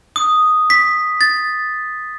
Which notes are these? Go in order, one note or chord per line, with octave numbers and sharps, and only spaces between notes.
D#6
B6
A6